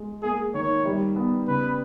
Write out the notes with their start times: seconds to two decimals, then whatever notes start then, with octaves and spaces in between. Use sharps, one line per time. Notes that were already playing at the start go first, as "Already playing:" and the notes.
Already playing: G#3
0.23 A#3 G#4
0.54 D#3 C#5
0.85 G3
1.16 B3
1.47 C#3 B4